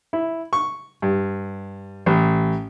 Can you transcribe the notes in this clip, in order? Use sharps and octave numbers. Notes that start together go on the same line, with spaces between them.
E4
C#6
G2
A1